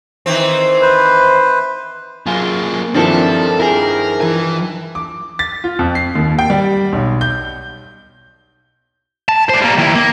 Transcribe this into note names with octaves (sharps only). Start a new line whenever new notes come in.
D#3 E3 C4
B4 C5
F#2 A#3 F4 G#4
G2 D#3 F3 C4 D4 E4 A4
E4 G#4 A#4
E3 G#5
D6
A6
F4
F2
C7
D#2
G5
G3
B1
G6
A5
D4 C5
G3 A#3
D#3 E4
A#3